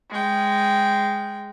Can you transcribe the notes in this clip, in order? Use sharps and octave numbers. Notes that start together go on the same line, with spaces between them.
G#3 G5